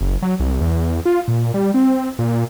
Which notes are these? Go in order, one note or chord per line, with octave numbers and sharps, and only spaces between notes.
F#1
F#3
C2
E2
F4
A#2
G3
C4
A#2